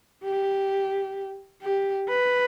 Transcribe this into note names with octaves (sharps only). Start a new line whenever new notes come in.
G4
G4
B4